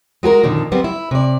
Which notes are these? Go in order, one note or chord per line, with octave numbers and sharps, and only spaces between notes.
G#3 F#4 A4 A#4
F2 A#2 D3 D#3
F#3 G3 B3 C4
E4
C3 D5